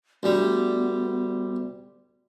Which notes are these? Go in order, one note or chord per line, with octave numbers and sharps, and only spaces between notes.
D2 G3 B3